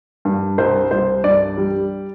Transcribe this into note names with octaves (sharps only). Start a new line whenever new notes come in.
G2
C2 C5
C2 C5
G2 D5
G3